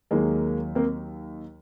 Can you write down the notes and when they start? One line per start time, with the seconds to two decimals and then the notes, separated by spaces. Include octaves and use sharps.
0.11 D#2 D#3 F#3 G#3 A#3
0.75 A#3 C4